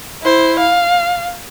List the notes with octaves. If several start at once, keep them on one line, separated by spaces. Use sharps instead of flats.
E4 C5
F5